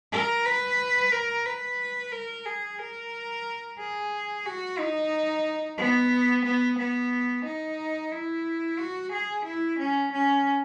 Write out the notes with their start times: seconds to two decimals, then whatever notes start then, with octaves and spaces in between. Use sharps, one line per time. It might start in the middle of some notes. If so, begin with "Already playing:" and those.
0.12 A#4
0.45 B4
1.12 A#4
1.46 B4
2.12 A#4
2.46 G#4
2.79 A#4
3.79 G#4
4.46 F#4
4.79 D#4
5.78 B3
6.45 B3
6.78 B3
7.45 D#4
8.12 E4
8.79 F#4
9.12 G#4
9.45 E4
9.79 C#4
10.12 C#4